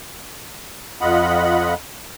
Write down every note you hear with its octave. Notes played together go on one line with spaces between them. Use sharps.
F2 F4 D#5 F#5 B5